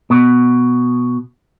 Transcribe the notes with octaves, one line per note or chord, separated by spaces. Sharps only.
B2